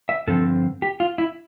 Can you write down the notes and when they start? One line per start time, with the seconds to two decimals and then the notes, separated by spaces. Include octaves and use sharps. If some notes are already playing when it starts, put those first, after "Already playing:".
0.09 E5
0.27 G2 D3 F3 C4 A4
0.82 G4
1.00 F4
1.18 E4